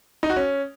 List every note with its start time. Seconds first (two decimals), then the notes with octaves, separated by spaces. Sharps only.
0.23 D#4
0.30 F#4
0.37 C#4